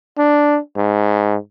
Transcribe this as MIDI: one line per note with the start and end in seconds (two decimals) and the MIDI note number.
0.18 0.59 62
0.77 1.36 44